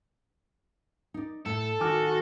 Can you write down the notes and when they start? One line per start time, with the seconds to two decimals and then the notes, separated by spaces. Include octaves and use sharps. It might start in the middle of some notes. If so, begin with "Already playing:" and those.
1.14 D#4 D5
1.46 A2 A4
1.80 D#3 F#4 G#5 D6 F6